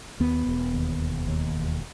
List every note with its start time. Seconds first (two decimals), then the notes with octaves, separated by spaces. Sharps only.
0.20 D#2 B3
0.47 E1
0.74 D#2
1.00 E1
1.27 D#2
1.55 E1